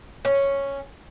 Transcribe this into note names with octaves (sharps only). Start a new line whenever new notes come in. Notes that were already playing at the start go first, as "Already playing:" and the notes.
C#4